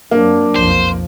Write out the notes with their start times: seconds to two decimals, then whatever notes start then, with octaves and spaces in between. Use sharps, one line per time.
0.11 F#2 F#3 A#3 C4 D4
0.56 B1 F2 F3 C5